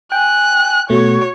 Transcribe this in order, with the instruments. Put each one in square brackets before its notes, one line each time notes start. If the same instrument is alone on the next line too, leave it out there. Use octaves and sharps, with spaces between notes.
[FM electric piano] G5 [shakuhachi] G#5 [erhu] F#6
[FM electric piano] B2 A3 [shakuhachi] F#4 [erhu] C#5